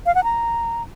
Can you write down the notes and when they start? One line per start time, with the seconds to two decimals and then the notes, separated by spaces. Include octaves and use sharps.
0.06 F5
0.15 F#5
0.24 A#5